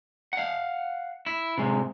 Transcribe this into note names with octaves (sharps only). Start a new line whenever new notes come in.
F5 F#5
E4
C3 G#3